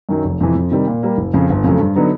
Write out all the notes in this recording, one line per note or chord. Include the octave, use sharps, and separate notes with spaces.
F#2 D#3 F#3
F1
F2 C3 E3
F2
C3 D#3 G3
A#2
G3 A#3
F#1
F2 C#3
G1
F2 C#3 F#3 A3
G2
D3 F#3 B3 D#4